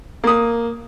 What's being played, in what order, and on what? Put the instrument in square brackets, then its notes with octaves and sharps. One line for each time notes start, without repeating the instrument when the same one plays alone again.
[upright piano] A#3 D#6